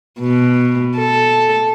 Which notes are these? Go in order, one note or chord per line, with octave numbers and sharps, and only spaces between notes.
B2
A4